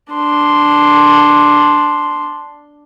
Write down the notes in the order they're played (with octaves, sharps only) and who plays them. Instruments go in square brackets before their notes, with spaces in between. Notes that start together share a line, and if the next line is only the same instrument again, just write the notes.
[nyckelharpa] D4 C6